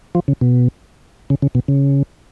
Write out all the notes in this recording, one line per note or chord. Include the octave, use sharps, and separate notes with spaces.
F3
C#3
B2
C#3
C#3
B2
C#3